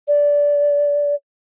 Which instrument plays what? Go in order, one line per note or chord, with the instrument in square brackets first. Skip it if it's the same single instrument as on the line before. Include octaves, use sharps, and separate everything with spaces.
[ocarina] D5